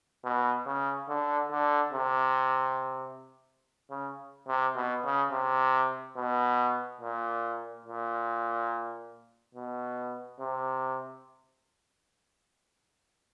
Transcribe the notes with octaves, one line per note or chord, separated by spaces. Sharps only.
B2
C#3
D3
D3
C3
C#3
C3
B2
C#3
C3
B2
A#2
A#2
B2
C3